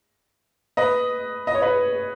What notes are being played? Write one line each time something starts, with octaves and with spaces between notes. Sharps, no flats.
B4 D#5
D#5
C#5
B4 D#5